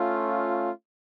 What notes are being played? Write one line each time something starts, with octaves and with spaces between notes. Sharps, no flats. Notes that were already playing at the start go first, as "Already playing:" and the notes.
Already playing: A3 C#4 F4